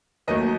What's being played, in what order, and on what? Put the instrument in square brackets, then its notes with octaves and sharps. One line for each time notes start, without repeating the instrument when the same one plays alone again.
[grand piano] D#2 D#3 F#3 A3 D#5